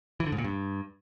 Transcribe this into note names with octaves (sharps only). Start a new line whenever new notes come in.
E3
D3
G#2
A#2
G2